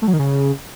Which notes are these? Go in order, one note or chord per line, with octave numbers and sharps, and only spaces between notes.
A3
F#3
D#3
C#3